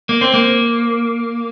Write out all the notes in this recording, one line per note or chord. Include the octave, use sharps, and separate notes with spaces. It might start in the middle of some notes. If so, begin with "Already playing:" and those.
A#3
C4
A#3